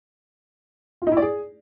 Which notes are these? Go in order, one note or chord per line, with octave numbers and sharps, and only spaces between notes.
F4
D#4
E4
D5
G#4